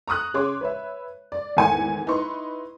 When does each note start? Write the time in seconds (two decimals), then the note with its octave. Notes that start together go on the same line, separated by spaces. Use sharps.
0.07 A#5 C#6 D#6 F#6
0.34 C#3 G#4 C#5 C6 D6
0.61 B4 C#5 E5
1.32 D5
1.57 G#1 E2 A3 G#5 C#7
2.07 D#4 E4 B4 C6 C#6